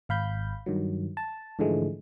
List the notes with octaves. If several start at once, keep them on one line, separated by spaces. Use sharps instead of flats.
G#1 F5 B5 G6
G2 D#3 F#3
A5
G#2 D3 E3 F3 G#3 A3